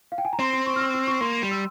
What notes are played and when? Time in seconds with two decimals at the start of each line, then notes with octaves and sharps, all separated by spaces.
0.12 F5
0.18 G5
0.25 G#5
0.33 A#5
0.39 C4 C6
0.53 C6
0.66 C#6
0.76 F6
0.80 E6
0.94 E6
1.07 C#6
1.21 A#3 C6
1.42 G3
1.51 E6